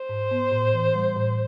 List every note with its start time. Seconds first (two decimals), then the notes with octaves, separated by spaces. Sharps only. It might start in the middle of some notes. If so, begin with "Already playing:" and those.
Already playing: C5
0.09 G#2
0.31 B3
0.52 A2
0.74 E3
0.95 G3
1.16 A2